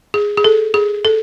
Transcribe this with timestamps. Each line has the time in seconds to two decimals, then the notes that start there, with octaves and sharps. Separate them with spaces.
0.14 G#4
0.37 G#4
0.44 A4
0.74 G#4
1.05 A4